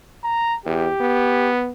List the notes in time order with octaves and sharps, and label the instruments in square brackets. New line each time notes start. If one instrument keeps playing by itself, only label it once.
[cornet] A#5
[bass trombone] E2 [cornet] G4
[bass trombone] B3